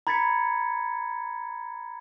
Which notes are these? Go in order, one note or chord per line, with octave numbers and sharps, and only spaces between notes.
A#5 B5 G#6 A6 B6 C#7